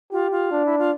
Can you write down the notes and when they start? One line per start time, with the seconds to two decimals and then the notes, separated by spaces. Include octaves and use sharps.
0.12 F4 G4
0.31 F4
0.51 D4
0.66 E4
0.79 F4